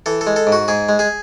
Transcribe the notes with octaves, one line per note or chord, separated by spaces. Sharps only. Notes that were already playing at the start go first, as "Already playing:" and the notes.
E3 A4
A4
G#3
A4
G#2
F#4
G#2 G#4
G#3
G#4